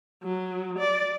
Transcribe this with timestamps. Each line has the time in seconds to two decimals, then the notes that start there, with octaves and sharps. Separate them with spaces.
0.23 F#3
0.79 D5